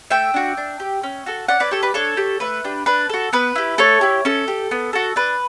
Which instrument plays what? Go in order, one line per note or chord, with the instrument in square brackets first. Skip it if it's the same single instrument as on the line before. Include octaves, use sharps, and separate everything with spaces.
[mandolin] A3 E5 G5
D4 F#4
D4
G4
C#4
F#4 A4
C#4 D5 F#5
B4 D5
G4 A4 C#5
B4 D5
D4 A4 C#5
G4
A3 B4
D4 G4
D4 B4
F#4 A4
B3 B4
E4 G4
A3 A4 C#5
E4 G4
C#4 A4
G4
B3
F#4 A4
D4 B4